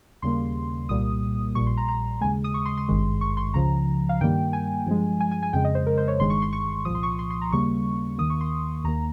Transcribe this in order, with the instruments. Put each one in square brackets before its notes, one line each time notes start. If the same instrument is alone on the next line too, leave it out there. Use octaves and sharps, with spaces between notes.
[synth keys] D#2 C#3 G3 A#3 C6
C2 A#2 G3 A#3 D#6
A#1 A#2 G3 C#6
C6
A#5
A#5
D#2 C#3 G#3 G#5
D#6
C#6
C6
C6
G#1 G2 D#3 G#3
C#6
C6
C#2 C#3 F3 A#5
F5
G2 D#3 G3 A#3 G5
G#5
G2 F3 G#3
G#5
G#5
G#5
F2 C#3 G#3 G5
D#5
C5
A#4
C5
C#5
G1 G2 D#3 G#3 C6
C#6
C6
C#6
C2 A#2 F3 D#6
C6
C#6
C6
C6
A#5
D#2 C#3 G3 A#3 C#6
D#2 D#3 A#3 D#6
C#6
C6
D#2 D#3 A#3 A#5